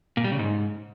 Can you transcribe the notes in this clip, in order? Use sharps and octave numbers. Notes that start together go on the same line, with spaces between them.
A#2
G3
C#3
G#2